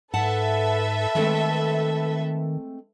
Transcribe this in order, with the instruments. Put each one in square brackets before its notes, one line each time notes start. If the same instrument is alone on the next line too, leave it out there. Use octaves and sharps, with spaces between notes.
[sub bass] G#2 [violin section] A4 B4 E5 [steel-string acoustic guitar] F#5 A5
[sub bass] D#3 [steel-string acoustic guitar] G#3 A3 C4